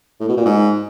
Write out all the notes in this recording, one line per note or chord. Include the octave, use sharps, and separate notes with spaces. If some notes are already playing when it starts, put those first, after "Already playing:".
A2
B2
A#2
G#2